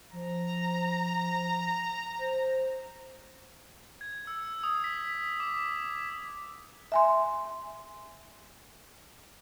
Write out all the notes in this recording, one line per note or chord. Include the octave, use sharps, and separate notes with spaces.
F3 A#5
C5
G#6
E6
D#6
B6
D6
E5 G#5 C6